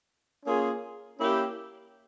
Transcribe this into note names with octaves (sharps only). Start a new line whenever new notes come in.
A#3 C#4 F4 G#4
A#3 C#4 E4 G4